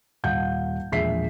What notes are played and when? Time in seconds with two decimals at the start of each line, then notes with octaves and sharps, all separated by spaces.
0.23 D#1 F5 F#5 G6
0.92 E1 A#1 G#4 E5 B6 C7